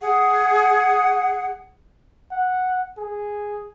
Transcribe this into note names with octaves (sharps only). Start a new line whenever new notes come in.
G#4 F#5
F#5
G#4